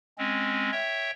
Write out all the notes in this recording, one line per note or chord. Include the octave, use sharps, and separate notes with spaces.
G#3 C4 C#4
C#5 E5 G5